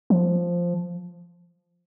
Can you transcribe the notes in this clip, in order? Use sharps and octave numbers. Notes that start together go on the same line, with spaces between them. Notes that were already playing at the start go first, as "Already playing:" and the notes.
F3